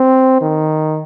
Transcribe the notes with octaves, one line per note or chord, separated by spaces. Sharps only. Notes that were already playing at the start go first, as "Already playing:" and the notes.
Already playing: C4
D#3